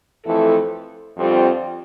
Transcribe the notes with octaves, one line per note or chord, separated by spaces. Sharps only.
F2 E3 A3 E4 A4
F2 D3 G3 C4 F4